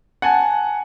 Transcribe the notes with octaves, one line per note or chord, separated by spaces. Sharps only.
F#5 G#5 A5